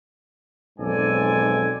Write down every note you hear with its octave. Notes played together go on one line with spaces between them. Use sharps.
B1 F2 G#2 A4 D5 G#5